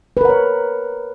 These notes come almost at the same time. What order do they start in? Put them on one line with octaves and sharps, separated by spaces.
B4 A#4 F#5 C#5